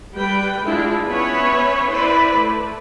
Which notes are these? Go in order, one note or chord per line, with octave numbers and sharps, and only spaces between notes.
G3 B4 G5
G#3 D4 E4 F4
B3 C#4 B4 C#5 E5
E4 B4 C5 D5
A3